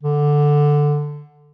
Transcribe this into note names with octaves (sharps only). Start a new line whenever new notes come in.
D3